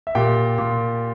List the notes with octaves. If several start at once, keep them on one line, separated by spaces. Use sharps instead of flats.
E5
A#2 G4 G5
A#2